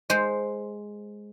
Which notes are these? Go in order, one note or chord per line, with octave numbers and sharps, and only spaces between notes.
G#3 C5